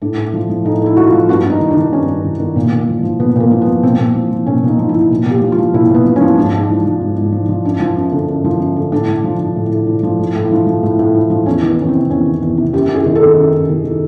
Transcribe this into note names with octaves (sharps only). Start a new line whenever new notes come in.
A2 D4
A2
F3
F3
A2 D#4
A2 E4
F3 F#4
F4
F3
G2 F#4
G2 D#4
D#3
D4
D#3
G2 C#4
G2
D#3
D#3
A#2
A#2
F3
F3
A#2 B3
A#2 A#3
F3
B3
F3
A#2 C4
A#2
F3
F3
A#2 C#4
A#2 D#4
F3
E4
F3
A#2
A#2 G4
F3
F4
F3
A#2 E4
A#2 B3
F3
C#4
F3
G#2 D4
G#2
F3
F3
G#2
G#2
F3
F3
F#2 D4
F3
F#2
D3
F#2
F3
F#2
D3
A2 D4
A2
F3
F3
A2
A2
F3
F3
A2
A2
F3
F3
A2
A2
F3
F3
E2 C#4
D#3 B3
E2 C#4
C4
C3
E2 C#4
D#3
E2
C3
F#2 G4
F#2
G#4
D#3
A4
D#3
F#2
F#2
D#3
D#3